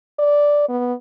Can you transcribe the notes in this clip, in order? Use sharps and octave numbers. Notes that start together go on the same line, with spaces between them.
D5
B3